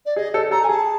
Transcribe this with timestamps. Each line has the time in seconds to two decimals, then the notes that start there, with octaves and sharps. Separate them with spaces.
0.05 D5
0.16 G#4 D#5
0.34 A4
0.51 A4 A#5
0.63 G#5
0.69 G#4 A5